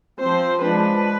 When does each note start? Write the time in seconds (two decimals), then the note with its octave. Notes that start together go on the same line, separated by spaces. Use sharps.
0.19 F3 C4 C5
0.61 F3 G#3 D4 B4